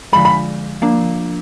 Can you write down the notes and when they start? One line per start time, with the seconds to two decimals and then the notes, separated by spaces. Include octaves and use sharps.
0.13 D3 F3 G#3 B5
0.25 B5
0.82 F3 A#3 D4